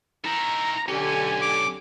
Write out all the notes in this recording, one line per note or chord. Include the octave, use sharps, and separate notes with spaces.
D#3 E4 A#5
B1 D3 C#4 G4 G#5
D6